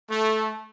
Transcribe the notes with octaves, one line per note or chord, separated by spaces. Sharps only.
A3